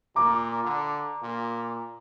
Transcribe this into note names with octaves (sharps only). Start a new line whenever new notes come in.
A#2 A#5 D6
D3
A#2